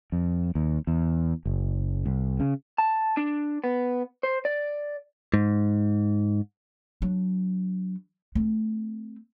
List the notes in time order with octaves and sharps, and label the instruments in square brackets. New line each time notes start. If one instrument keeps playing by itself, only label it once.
[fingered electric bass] F2
D#2
E2
F#1
C2
C#3
[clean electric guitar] A5
D4
B3
C5
D5
G#2
[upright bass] F#3 D4
A3 C4